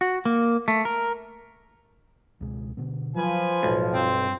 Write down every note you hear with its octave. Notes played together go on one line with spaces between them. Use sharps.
F#4
A#3
A3
A#4
C#2 B2 G#3
B2 D3 B3
F3 F#3 B4 G#5
B1 A2 F#3 G#3
G2 C4